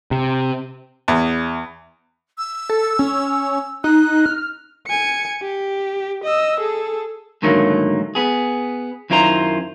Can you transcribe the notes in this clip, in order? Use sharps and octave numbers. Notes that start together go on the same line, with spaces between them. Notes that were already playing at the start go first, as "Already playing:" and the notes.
C3
E2
E6
A4
C#4
D#4 F#6
F6
G#5 C#7
G4
D#5 E6
G#4 A4
G#2 D3 D#3 F#3 A3 A#3
B3 G#4
F#2 D#3 E4 F4 C5 A#5